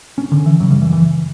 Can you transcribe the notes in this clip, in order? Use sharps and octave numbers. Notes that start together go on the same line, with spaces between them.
C#4
D3
E3
F#2 C#3 F#3
G3
E3
E3